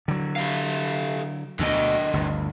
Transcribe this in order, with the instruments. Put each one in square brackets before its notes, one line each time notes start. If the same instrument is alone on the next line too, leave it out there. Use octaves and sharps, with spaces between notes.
[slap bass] D3 F#3
[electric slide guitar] G4 A4 F5
[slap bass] D2 B2 [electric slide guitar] D3 D#5
[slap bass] G1 D2